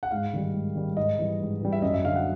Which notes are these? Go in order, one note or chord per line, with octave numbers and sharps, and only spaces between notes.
F#5
G#2 F5
D#3 G3
G#2
D#3 G3
G#2 D#5
E3 G3
G#2
E3 G3
E5
F#2 D#5
E5
D3 F#3 F5
F#5